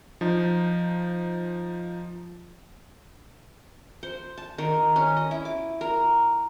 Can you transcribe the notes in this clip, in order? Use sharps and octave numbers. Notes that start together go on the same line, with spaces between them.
F3 D#4
C5
A5
D#3
C#4
D#5
E4
D6
A#4